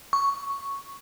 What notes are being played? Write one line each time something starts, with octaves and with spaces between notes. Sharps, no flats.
C#6